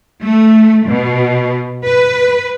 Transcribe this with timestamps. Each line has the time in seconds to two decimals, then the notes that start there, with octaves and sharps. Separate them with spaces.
0.23 A3
0.87 B2
1.84 B4